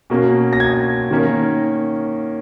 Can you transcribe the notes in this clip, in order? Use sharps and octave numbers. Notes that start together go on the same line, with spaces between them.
B2 A#3 C#4
A#6
G#6
D#3 A#3 C#4